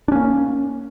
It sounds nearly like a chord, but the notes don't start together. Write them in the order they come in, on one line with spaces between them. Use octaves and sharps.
D4 C#4 A#3